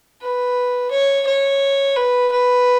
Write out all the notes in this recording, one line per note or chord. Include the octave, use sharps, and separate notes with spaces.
B4
C#5
C#5
B4
B4